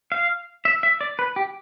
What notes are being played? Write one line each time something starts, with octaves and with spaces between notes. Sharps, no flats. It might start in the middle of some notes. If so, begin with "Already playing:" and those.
F5
E5
E5
D5
B4
G4